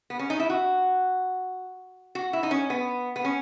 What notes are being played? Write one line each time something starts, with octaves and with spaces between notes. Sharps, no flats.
B3
C#4
D#4
E4
F#4
F#4
E4
D#4
C#4
B3
B3
C#4